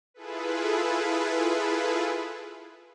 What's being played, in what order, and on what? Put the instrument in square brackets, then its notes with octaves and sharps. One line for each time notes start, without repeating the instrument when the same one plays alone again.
[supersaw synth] E4 F4 G#4 A4 B4